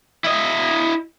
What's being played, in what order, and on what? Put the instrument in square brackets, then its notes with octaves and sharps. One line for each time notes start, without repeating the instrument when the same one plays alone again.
[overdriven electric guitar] E4 D#5